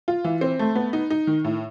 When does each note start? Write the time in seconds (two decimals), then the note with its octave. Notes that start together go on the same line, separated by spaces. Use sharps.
0.08 F4
0.24 E3
0.41 C4
0.59 A3
0.75 B3
0.93 D#4
1.10 D#4
1.27 D#3
1.44 A2